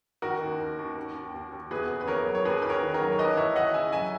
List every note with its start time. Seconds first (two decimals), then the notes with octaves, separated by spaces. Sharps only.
0.22 D#3 F#4 A#4
0.41 D#2
0.60 D#2
0.79 D#2
0.97 D#2
1.15 D#2
1.34 D#2
1.52 D#2
1.70 E2 G#4 B4
1.89 C#3
2.01 B4
2.07 E2 A#4 C#5
2.26 F#3
2.35 C#5
2.45 D#2 G#4 B4
2.62 D#3 B4
2.69 A#4 C#5
2.81 D#3
2.94 A#4 C#5
3.01 F#3
3.12 C#5
3.19 D#2 B4 D#5
3.37 E3 C#5 E5
3.56 D#2 D#5 F#5
3.74 C#3 E5 G#5
3.92 F#3 E5 G#5